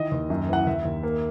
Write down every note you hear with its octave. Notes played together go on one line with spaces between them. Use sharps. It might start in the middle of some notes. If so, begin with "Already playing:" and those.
Already playing: D#3 E3 D#5
D#2
F#2
E3 F#5
D#2 E5
D#2
A#3